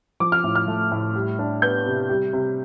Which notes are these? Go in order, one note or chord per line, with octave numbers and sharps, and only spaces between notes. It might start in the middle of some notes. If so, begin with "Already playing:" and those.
F3 D6
F6
A2
F6
A3
A2
G3
D4
B3 G6
C3
G3
C3